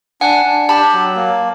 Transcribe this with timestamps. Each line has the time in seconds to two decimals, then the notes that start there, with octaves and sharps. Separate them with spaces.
0.21 D4 F#5 G#5
0.46 D4
0.69 G4 A5 B5
0.93 F#3
1.16 A#3